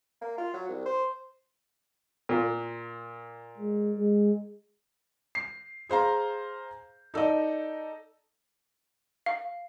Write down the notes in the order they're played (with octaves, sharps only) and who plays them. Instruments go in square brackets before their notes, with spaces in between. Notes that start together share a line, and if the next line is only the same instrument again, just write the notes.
[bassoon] A#3
F4
F#3
C2
C5
[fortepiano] A#2
[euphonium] G#3
G#3
[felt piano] C7
G#4 C5 F5 A#5
D#4 A4 D5 D#5
[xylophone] F5